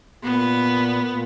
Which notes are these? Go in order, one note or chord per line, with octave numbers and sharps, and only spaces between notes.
A#2 B3
A#2